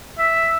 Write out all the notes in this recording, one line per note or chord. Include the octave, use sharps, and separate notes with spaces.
E5